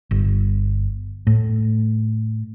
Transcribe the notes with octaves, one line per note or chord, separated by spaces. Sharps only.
G1
A2